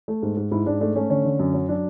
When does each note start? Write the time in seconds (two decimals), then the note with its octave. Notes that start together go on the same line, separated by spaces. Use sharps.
0.08 A3
0.23 G#2
0.37 G#2
0.51 G#2 E4
0.66 G#2 D4
0.81 A3 D4
0.96 A3 C#4
1.10 D3 C#4
1.25 D3
1.39 F#2
1.54 F#3
1.69 F#3 D4